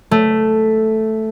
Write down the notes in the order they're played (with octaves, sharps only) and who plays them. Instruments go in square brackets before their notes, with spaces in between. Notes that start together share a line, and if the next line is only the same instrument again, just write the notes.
[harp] A3